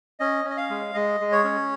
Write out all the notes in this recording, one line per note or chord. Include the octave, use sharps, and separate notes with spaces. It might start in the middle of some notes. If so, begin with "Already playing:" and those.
C#4 D#5
C#4
D#5
F5
G#3
G#3 D#5
G#3
C#5
C#4